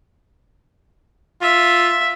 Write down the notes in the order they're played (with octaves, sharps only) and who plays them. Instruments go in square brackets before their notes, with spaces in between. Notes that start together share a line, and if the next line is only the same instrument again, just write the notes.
[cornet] F4 [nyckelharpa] E5